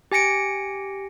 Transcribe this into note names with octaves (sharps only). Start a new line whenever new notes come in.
G4 G#5 A#6 C#7 D7